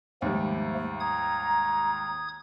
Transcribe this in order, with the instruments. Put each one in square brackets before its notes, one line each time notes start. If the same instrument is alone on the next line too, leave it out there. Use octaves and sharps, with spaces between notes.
[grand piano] D#2 G#2 G3 [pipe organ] F3 A3 A#3
[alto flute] A#5 [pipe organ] D#6 G#6